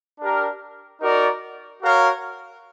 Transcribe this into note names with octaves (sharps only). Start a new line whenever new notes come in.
D4 G4 A#4
D#4 F#4 A#4 D5
F#4 A#4 C#5 F5